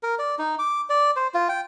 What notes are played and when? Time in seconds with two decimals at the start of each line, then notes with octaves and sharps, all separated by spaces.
0.03 A#4
0.19 D5
0.39 D#4
0.59 D6
0.90 D5
1.16 C5
1.34 F4
1.49 G5